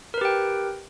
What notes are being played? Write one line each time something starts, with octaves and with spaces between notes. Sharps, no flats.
G4 A#4 B4 G5